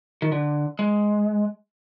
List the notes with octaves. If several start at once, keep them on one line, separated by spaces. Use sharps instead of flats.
D#3
D3
G#3